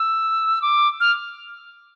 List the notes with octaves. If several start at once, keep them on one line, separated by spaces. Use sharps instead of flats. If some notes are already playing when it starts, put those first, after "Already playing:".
Already playing: E6
D6
F6